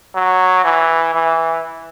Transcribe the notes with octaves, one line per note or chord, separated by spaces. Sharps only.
F#3
E3
E3